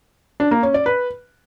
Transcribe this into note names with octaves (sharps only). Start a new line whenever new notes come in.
D4
A#3
C#4
D5
B4